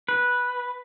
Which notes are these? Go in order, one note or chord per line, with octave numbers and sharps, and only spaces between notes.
B4